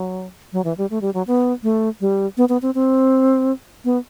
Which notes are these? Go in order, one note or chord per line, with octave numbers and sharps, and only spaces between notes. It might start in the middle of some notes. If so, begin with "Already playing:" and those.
Already playing: F#3
F#3
E3
G3
A3
G3
F#3
B3
A3
G3
B3
B3
C4
C4
B3